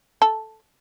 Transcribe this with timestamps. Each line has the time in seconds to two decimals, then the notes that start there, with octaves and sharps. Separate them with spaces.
0.22 A4